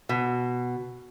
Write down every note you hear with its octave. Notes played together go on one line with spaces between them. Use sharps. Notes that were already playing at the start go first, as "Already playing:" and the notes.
B2